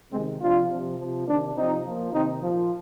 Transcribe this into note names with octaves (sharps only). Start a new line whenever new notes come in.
C3 D#3 G#3 C4
C3 F3 D4 F4
C3 F3
F3
C3
C3 D#3 A#3 D4
C3 F3 C4 D#4
A#2 F3
C3 D#3 C4 D#4
A#2 F3